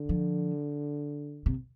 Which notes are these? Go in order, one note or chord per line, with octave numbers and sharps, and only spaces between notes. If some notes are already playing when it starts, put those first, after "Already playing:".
Already playing: D3
F3
C3